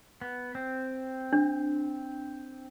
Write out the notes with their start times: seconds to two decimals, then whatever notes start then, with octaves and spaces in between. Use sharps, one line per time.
0.21 B3
0.55 C4
1.33 D4